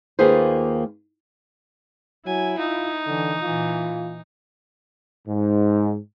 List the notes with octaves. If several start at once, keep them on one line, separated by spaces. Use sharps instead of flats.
D#2 A#3 F4 G#4 B4 C5
F#3 E4 G#5
D#4 F4
D3 E3
A#2 E3 F4
G#2